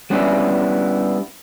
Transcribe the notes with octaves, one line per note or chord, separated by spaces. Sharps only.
G3 B3 C#4 D4 E4